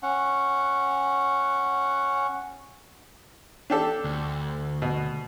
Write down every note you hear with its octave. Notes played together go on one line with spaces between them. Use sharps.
C#4 F#5
D4 G4 A4
D2
B2